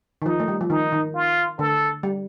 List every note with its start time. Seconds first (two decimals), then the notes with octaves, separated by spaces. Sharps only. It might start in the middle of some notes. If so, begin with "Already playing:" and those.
0.22 D#3
0.26 F3 D#4
0.40 A3
0.48 G3
0.61 F3
0.70 D#3 D#4
0.92 D#3
1.15 F4
1.59 D3 A4
2.03 G3